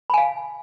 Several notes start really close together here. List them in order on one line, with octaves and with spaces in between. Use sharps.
B5 G#5 F5